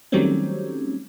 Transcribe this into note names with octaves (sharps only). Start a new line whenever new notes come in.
D#3 F#3 G3 A3 C4 C#4